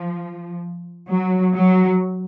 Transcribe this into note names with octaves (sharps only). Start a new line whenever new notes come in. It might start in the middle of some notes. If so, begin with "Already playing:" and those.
Already playing: F3
F#3
F#3